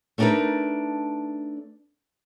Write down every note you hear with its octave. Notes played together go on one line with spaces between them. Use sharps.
A3 B3 D4 D#4 A#4 B4